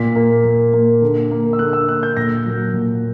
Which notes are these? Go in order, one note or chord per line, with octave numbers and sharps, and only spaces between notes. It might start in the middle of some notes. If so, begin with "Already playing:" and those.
Already playing: A#2 B6
A#3
A#2
A#3
D3
A#3
E6
D3 F#6
E6
A#3 F#6
G6
A#2 A#6
F#3 A#3
A#2